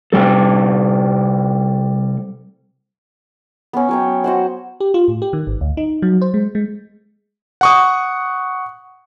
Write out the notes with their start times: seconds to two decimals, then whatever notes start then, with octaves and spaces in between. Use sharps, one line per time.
0.13 C3 G3 A4
3.73 B3 C#4
3.89 F#3 C#5 G5
4.24 F#4 C5 F#5
4.80 G4
4.94 F4
5.08 A2
5.22 G4
5.33 D#3
5.47 G#1
5.61 D2
5.77 D#4
6.02 F#3
6.21 C5
6.34 G#3
6.55 G#3
7.61 F#5 C#6 D#6